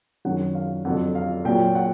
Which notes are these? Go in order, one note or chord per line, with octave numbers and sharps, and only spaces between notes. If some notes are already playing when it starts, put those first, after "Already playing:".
F#2 D#3 F#3 F#5
F5
F2 D3 F#3 F#5
F5
A#2 F#3 G5
F#5